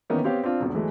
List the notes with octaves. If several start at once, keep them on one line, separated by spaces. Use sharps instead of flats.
D#3 E3 A#3 B3 C#4 D#4
B3 C4 G4 C#5 F5
C4 D4 F4
E1 E2 D3
E3 F#3 G#3 A3